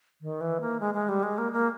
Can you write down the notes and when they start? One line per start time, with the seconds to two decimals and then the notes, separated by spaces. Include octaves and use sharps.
0.21 D#3
0.41 E3
0.61 A#3
0.80 G#3
0.94 G#3
1.09 G3
1.23 G#3
1.38 A#3
1.52 A#3